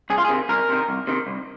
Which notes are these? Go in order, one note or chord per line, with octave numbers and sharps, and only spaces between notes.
C2 G#4
F4
G#4
C3 D#3
C2 A#4
C3 D#3
C2
C3 D#3
C2